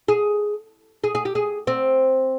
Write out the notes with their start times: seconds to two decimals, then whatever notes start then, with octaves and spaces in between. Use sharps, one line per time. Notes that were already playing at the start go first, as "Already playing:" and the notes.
0.08 G#4
1.04 G#4
1.15 G#4
1.25 G4
1.35 G#4
1.67 C4